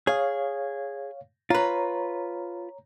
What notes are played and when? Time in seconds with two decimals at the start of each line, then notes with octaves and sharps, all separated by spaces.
0.07 G#4 C#5 F5
1.50 F4 B4 C#5 A#5